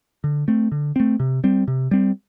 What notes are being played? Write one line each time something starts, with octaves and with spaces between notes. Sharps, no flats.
D3
A3 C4
D3
A3 C4
C3
G3 C4
C3
G3 C4